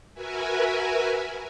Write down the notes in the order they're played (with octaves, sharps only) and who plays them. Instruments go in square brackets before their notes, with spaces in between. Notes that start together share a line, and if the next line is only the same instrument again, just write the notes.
[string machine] F#4 A#4 B4 E5 G#5